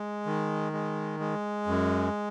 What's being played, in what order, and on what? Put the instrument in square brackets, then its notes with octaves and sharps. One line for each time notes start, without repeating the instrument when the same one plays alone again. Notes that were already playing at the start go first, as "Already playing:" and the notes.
Already playing: [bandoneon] G#3
D#3
G#3
G#3
F#2